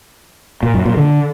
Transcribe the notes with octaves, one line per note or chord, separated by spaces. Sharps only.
A#2
F#2
A#2
D3